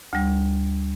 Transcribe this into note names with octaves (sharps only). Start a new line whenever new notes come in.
D2 G3